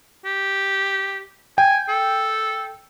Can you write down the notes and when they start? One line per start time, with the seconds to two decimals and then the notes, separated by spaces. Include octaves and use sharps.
0.25 G4
1.58 G5 G#5
1.89 A4